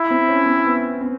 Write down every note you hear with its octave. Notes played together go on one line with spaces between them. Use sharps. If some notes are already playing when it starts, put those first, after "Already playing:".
Already playing: E4
C4
C#4
C4
B3
C4